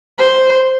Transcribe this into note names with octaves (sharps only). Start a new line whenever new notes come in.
C5